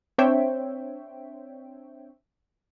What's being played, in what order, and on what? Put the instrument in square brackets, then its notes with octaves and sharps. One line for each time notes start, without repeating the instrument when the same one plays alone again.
[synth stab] C4 D4 C5 C#5 E5 G5